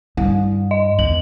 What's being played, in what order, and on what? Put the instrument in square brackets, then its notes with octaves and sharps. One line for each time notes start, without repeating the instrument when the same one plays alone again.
[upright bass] G2 [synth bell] G3
[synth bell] D#5
[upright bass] E2 [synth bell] F#7